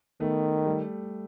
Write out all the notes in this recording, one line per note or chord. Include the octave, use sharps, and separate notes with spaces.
D#3 A3 B3
G3 A3